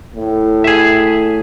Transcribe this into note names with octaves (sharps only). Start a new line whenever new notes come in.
A2
G#4 E5